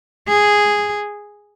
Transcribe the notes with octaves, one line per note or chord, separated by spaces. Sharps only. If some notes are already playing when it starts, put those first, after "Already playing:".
G#4